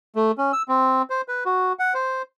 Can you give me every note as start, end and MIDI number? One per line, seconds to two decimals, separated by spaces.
0.16 0.32 57
0.38 0.52 61
0.53 0.62 88
0.69 1.02 60
1.10 1.21 72
1.28 1.44 71
1.46 1.73 66
1.79 1.94 78
1.94 2.22 72